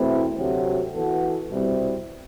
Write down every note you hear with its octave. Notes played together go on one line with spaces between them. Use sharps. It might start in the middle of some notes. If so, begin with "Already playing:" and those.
Already playing: E2 B2 A3 C4 E4
D2 C3 F#3 A3 C4
E3 B3 F#4 A4
C2 B2 G3 C4 E4